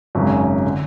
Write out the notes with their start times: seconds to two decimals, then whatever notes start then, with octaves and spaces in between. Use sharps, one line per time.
0.15 G#1 F#2 C#3
0.66 D3